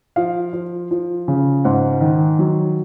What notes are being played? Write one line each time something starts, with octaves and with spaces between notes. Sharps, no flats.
F3 F5
F3
F3
C#3
G#2 F#5
D#3
F#3